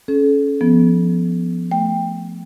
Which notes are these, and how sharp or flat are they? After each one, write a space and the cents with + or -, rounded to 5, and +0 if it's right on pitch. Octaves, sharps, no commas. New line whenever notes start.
C#4 +0 A4 -35
F3 +0 B3 +0
A3 +0 G5 +15